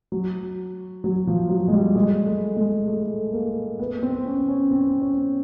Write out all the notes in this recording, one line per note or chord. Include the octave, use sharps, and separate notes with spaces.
F#3
F#3
F3
F#3
G#3
G3
G#3
A3
G#3
A3
A#3
B3
C4
C#4
C#4
C4
C#4